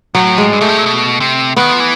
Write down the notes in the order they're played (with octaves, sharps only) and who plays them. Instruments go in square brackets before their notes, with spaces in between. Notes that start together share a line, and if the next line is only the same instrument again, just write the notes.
[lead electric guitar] A2 [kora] F#3
[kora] G#3
[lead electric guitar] G2
[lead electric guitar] G#2 [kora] A3
[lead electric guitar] A2
A#2
B2
C3
[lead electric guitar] D#3 [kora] B3
[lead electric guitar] F3
E3